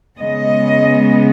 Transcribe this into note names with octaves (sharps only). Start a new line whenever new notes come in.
C#3 G#3 B3 D#5